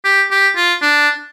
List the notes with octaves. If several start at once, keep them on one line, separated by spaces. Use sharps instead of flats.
G4
G4
F4
D4